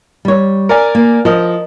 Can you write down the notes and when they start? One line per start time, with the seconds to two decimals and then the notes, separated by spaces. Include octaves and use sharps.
0.25 G3 C#5
0.69 A#4 D5 G#5
0.95 A#3
1.25 F3 A#4 D#5